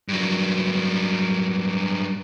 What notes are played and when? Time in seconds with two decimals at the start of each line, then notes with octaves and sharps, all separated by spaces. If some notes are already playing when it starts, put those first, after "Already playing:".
0.08 G2 F#3